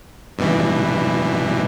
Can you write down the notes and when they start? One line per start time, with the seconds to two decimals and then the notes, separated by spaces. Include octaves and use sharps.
0.38 G2 B2 E3